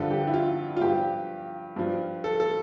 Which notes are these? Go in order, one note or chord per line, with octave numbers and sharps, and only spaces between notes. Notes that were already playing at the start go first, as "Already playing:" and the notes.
Already playing: G2 D3 F3 A4
G4
E4
F4
F4
G2 F3 G4
G2 F3
A4
A4